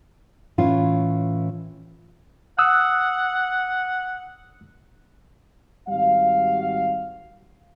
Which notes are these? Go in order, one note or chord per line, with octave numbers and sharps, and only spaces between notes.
A2 E3 C#4 F4
F#5 D#6 E6 F#6
G#1 G3 F#4 F5